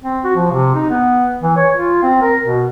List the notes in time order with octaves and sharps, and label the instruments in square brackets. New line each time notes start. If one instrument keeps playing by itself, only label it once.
[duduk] C4
F#4
F3
C3
D#4
B3
E3
C#5
F4
C4
A#4
B2